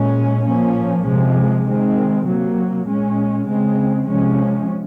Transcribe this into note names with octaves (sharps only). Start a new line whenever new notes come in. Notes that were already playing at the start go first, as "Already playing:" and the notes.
Already playing: A#2 G#3 C#4
A#2 F3 A#3 C#4
C3 F3 G#3
D#3 G#3 C4
C3 F#3 A#3
A#2 G#3 C#4
C#3 G#3 C4
C3 F3 G#3 C#4